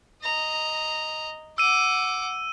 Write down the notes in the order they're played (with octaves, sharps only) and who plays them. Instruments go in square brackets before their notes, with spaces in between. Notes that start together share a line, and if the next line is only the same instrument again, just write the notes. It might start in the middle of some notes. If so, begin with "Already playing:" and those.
[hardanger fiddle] D#5 A#5
[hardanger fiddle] F#5 D6 [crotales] E6 D#7